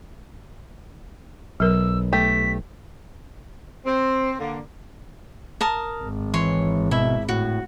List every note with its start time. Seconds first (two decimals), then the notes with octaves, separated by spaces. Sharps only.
1.60 B1 F#3 A#4 E6
2.13 A3 G4 B6
3.86 C4
4.39 D3 A#3
5.61 A#4 A5 D#6
6.03 G#1
6.34 E3 C#5 C6
6.91 B2 E4 E5
7.29 A2 F#4